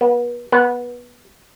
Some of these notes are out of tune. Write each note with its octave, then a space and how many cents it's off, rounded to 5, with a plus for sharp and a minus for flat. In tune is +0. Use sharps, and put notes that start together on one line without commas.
B3 -35
B3 -15